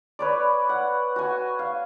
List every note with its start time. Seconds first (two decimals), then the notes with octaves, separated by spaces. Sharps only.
0.19 B4 C#5 D5
0.69 F#5
1.16 F#4 G#5
1.59 F5